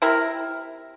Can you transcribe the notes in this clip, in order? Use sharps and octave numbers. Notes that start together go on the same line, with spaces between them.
C3 E4 A#4